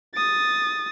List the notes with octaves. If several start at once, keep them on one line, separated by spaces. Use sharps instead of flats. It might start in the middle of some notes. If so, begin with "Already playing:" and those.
D#6 A6